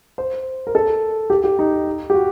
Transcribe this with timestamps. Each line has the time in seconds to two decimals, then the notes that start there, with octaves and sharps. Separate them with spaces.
0.18 C5
0.67 A#4
0.75 A4
1.30 G4
1.44 G4
1.59 D#4
2.10 G4
2.14 F#4